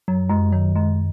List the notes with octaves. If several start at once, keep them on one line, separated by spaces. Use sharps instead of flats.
F#2 F#3
F#2 G#3
D#3 F#3
F#2 G#3